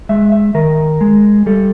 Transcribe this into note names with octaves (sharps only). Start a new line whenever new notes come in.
G#3 E5
E5
D#3 A#4
G#3
G3 A4